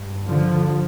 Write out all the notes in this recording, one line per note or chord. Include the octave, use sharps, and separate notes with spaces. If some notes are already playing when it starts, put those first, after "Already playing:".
Already playing: G2
D3 F3